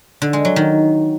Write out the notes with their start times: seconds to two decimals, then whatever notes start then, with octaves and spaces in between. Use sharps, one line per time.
0.22 D3
0.33 G#3
0.45 F#3
0.56 D#3